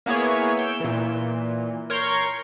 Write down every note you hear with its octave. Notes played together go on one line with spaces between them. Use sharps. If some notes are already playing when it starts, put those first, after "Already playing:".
A#3 B3 E4 G#4 C#5
E6 G6 D7
A#2 E3
A#4 C#5 C6 G6 G#6